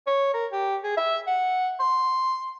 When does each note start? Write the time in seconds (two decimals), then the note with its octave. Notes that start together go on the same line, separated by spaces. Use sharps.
0.07 C#5
0.34 A#4
0.52 G4
0.84 G#4
0.97 E5
1.27 F#5
1.80 C6